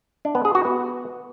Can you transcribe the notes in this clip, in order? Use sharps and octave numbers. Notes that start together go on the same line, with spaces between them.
D4
B3
G#4
F#4
B3